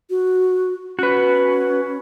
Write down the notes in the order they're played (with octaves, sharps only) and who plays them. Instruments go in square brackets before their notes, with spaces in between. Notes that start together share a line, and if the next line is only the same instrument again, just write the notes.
[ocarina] F#4
[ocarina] C#4 [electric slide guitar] F#4 B4